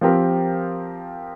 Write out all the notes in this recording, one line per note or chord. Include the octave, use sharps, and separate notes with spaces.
F3 C4 G4 A#4